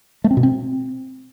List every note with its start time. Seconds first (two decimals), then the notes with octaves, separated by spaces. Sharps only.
0.24 A3
0.31 C4
0.37 B2
0.43 C4